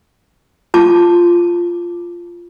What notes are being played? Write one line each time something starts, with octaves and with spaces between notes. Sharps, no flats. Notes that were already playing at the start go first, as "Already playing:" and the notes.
F4 A5 D6